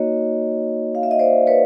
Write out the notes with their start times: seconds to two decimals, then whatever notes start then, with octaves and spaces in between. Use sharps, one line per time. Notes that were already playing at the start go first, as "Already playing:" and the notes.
Already playing: A#3 D#4 F#4 C#5 D#5
0.95 F5
1.03 E5
1.11 D#5
1.19 C5 D5
1.47 B4 C#5